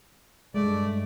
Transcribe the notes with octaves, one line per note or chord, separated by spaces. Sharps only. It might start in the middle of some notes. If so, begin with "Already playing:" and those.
G2 G#3 A3 D5